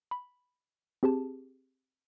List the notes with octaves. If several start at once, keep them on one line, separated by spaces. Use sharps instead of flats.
B5
C4 G4 G#4 A5